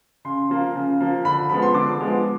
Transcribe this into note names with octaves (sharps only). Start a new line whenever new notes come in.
C#3 C6
F3 A#3
C#3
F3 A#3
D3 B5
F3 G#3 B3 B5
C6
D3 D6
F3 G#3 B3